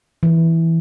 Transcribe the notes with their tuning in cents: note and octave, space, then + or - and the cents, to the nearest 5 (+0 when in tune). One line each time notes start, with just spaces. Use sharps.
E3 -5